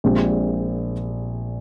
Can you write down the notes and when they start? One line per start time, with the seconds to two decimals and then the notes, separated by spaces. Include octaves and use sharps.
0.04 A#1 A#2 G#3 C4 G4